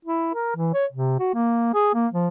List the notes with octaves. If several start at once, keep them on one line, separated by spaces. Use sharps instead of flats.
E4
A#4
E3
C#5
C3
F#4
A#3
G#4
A#3
F3